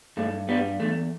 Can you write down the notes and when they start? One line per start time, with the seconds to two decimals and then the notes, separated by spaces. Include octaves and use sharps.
0.17 G2 A3
0.48 G2 G3 B3
0.79 E2 A3